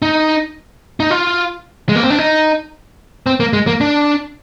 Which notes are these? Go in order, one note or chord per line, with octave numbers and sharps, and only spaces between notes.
D#4
D#4
F4
G#3
A#3
C4
D4
D#4
C4
A#3
G#3
A#3
D4